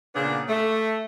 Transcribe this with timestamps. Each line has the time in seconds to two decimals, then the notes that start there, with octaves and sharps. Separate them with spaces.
0.15 A#2 C#3 B3 D4
0.48 A3